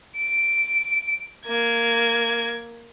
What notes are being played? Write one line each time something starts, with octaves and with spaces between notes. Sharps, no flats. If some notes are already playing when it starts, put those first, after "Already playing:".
D7
A#3 G#6